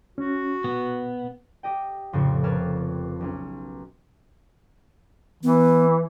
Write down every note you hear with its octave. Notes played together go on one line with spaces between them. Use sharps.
C#4 F#4
B2 B3
G4 D#5 G5
F1 F2 A2 C#3
A#4 B4 C#5 A5 D6 F6
B1 C#4
E3 B3